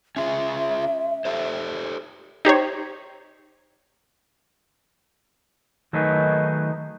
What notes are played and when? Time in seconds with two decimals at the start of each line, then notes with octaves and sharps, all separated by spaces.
0.16 C#4 F4 G#4 E5
1.25 G4 A4 C5
2.45 D#4 G4 C5 C#5
5.93 D#3 F#3 A3 D#4 G#4 B4